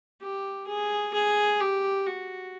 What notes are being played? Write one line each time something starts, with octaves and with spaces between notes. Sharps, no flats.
G4
G#4
G#4
G4
F#4